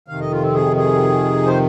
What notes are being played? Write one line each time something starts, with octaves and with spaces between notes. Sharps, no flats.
F2 C3 D#3 F5
D#5
F4
C4
G#4
G#4
C5